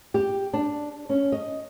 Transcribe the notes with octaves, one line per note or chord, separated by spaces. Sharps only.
G4
D4
C#4
D#5